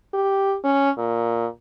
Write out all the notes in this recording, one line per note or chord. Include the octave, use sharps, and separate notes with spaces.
G4
C#4
A#2